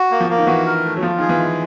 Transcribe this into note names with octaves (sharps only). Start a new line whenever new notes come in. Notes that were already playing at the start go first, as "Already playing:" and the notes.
Already playing: F#4
A#3
F3
A#3
D#3
E3 F#4
A#4
A3
F#3
F3 F4
D#3 G#4
E3
G#3